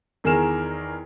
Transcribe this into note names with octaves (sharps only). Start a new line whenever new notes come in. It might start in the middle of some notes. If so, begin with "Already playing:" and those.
E2 D#3 G#4 A#4 E7